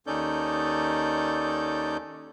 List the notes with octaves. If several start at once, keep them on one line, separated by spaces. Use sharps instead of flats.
D#2 C#4 D#4 A4 D5 G6